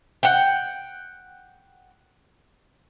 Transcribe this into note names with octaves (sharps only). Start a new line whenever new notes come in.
F#5 G5